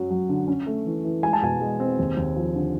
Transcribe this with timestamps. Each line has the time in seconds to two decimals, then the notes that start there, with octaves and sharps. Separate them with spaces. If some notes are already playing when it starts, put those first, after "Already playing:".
Already playing: F#2 F#3
0.10 F#3
0.29 D3
0.48 C#4
0.66 A3
0.86 E3
1.04 E3
1.23 G#3 G#5
1.33 A5
1.42 B2 G#5
1.61 G#3
1.80 C4
1.99 D#2
2.17 D#2
2.37 F3
2.55 D3